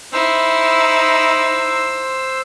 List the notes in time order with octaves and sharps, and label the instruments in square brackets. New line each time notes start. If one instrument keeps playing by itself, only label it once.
[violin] D#4 E4 [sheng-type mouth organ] C5 E6